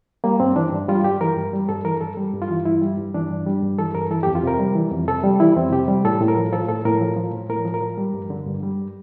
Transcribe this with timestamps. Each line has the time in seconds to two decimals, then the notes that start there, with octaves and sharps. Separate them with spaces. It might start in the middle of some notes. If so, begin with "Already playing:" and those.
0.24 G3 A#3
0.40 G2 C4
0.56 E3 D4
0.72 G2
0.88 G3 F4
1.04 G2 G4
1.21 E3 A#4
1.37 G2
1.53 G3
1.69 G2 A4
1.85 E3 A#4
2.01 G2 A4
2.17 G3
2.34 G2
2.42 F4
2.50 E3
2.65 G2 E4
2.81 G3
2.99 G2
3.14 E3 D4
3.30 G2
3.46 G3
3.62 G2
3.78 E3 A4
3.95 G2 A#4
4.11 E3 A4
4.23 G4
4.27 F2
4.35 F4
4.43 C3 A#4
4.59 G3
4.75 E3
4.91 F2
5.08 C3 A4
5.24 G3
5.40 E3 E4
5.56 F2 C4
5.72 C3 G4
5.88 G3
6.04 A2 A4
6.20 A2
6.28 A#4
6.37 F3
6.52 F3 A4
6.69 A2 A4
6.85 A2 A#4
7.01 F3
7.17 F3
7.33 A2
7.50 A2 A#4
7.65 F3
7.74 A#4
7.82 F3
7.97 G3
8.14 G2
8.30 D3
8.47 G2
8.63 G3